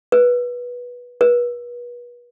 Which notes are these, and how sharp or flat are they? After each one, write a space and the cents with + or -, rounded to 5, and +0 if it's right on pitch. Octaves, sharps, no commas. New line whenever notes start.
B4 -15
B4 -35